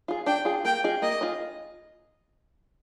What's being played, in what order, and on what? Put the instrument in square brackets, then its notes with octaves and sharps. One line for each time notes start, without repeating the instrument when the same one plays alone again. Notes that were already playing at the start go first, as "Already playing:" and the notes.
[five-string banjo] F4 G#4
[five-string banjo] D4 [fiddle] G5
[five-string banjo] F4 G#4
[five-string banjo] A#3 [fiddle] G5
[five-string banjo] F4 G#4 D#5
[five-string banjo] A#3 [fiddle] D#5
[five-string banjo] F4 G#4 D#5